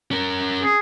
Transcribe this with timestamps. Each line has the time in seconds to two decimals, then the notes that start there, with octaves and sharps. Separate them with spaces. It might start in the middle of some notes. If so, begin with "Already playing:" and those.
0.11 C#4 A#4
0.62 G#4